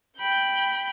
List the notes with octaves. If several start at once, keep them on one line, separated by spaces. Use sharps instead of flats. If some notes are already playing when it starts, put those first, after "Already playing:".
G5 B5 G6